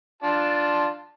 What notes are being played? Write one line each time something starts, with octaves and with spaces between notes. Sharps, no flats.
D4 F4 A5